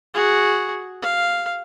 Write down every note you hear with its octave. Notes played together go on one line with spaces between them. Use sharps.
F#4 G#4
F5